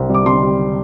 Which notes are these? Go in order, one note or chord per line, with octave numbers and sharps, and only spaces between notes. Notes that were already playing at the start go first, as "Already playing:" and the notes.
Already playing: C2 C4
G3 D6
G3 C6
G3